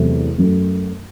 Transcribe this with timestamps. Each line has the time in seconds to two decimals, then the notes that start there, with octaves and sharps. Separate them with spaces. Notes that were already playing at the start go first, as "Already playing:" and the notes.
Already playing: E2 C3 F#3 A3
0.38 F#2 F#3 A3